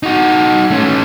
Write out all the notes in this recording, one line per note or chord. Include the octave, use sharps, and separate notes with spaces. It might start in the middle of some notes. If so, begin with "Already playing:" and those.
D#4 F#4
A3 C#4